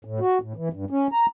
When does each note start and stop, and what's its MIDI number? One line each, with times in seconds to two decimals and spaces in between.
0.05 0.20 45
0.20 0.38 66
0.42 0.53 45
0.56 0.69 52
0.73 0.85 43
0.90 1.07 61
1.12 1.26 82